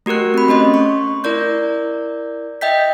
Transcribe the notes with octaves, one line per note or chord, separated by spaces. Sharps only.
A3 F#4 G4 A#4 F#6
C4 B5
A3 C#4 D#5 C6
C#6
E4 A#4 D5 G6
D#5 E5 G5 G6 B6